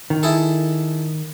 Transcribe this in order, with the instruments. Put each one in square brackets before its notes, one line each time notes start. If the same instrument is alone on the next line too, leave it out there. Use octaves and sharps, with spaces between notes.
[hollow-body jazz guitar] D#3
[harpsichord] E4 G#4 A4